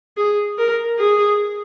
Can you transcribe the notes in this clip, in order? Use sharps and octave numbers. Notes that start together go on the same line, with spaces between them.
G#4
A#4
G#4